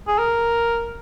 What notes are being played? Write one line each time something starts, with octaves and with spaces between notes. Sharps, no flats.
G#4
A#4